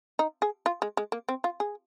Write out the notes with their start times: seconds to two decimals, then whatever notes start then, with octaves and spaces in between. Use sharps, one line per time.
0.19 D#4
0.42 G#4
0.66 F4
0.82 G#3
0.97 G#3
1.12 A#3
1.29 C4
1.44 F4
1.60 G#4